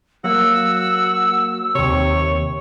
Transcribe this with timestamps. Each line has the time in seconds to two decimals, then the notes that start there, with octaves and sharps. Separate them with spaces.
0.24 F#3 A#3 F#4 E6
1.75 D#2 C3 C#5